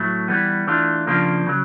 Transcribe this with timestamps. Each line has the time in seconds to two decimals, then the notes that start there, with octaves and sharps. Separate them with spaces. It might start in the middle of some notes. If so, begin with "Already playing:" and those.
Already playing: A2 F#3 A3
0.28 E3 G3 B3
0.67 E3 A3 D4 F4
1.07 C#3 F3 A#3 D4 F4
1.46 C#3 F#3